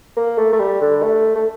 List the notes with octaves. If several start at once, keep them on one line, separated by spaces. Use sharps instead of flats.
A#3
A3
A3
G3
D3
A3
A3